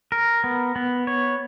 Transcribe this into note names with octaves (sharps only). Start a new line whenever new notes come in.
A#4
B3
B3
C#5